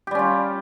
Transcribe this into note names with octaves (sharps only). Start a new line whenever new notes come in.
G3 C#4 F4 G4